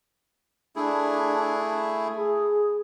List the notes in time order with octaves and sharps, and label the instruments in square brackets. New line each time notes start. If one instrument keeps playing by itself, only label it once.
[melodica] A3 E4 G#4 [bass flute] D4
[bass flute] G#4